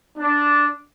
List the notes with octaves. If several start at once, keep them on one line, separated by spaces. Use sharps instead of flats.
D4